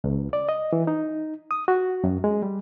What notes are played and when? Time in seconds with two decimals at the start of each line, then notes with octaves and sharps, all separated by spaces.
0.04 C#2
0.33 D5
0.49 D#5
0.73 E3
0.87 D#4
1.51 D#6
1.68 F#4
2.04 F#2
2.24 G#3
2.42 G3